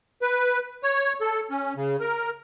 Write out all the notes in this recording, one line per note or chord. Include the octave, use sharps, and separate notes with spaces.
B4
C#5
A4
C#4
C#3
A#4